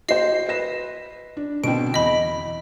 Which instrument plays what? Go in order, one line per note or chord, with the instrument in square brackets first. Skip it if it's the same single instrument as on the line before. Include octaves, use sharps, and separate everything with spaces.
[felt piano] F#4 C5 [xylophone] D#5 C7
[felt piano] B4 A#6 E7
D4
[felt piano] B2 D3 C4 [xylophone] D7
[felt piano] E2 B6 [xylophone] D#5 B5